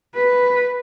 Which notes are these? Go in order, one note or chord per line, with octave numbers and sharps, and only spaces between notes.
B4